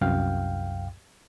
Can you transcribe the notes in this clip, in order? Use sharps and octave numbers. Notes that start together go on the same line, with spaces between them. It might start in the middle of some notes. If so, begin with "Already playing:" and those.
C2 F#2 F5 G5